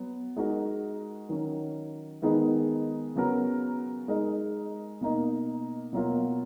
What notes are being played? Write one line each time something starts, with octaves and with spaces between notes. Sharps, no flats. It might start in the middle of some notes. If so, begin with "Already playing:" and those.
Already playing: F#3 B3
G#3 D#4 F#4 A#4
D#3 F#3 C#4
D#3 G#3 B3 D#4 G#4
C#3 F#3 B3 F#4 A#4
G#3 D#4 A#4
B2 A#3 D#4
B2 F#3 A#3 F4